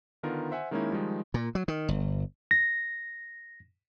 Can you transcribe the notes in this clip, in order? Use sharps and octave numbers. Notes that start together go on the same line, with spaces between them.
D3 D#3 B3 F4 A#4
C5 E5 F#5 G#5
D#3 G#3 A#3 C#4 D#4 E4
D#3 F3 G3 G#3 D#4
A#2
F#3
D#3
G1
A#6